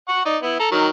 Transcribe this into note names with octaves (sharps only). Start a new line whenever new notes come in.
F#5 C#6
D#4 D5
B3 E4
A4 A#5
D#3 F#3 A#4